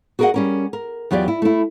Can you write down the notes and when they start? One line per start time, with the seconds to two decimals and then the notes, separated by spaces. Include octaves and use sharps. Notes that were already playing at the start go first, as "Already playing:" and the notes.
0.19 F#4 G#4 A#4 D5 D#5 F#5
0.34 G3 C#4 A#4
0.73 A#4
1.11 E2 F#3 F4 G4 D5
1.28 E4
1.42 A3 E4